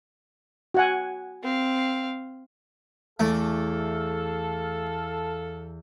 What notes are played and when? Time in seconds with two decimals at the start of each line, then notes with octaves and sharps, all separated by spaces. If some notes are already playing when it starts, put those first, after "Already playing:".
0.74 F#4 F#5 G#5
1.43 C4 F5
3.20 E2 A3 E4 A4 F5 D6